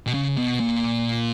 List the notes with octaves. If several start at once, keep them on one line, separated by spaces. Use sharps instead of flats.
B2
C#3
B2
A#2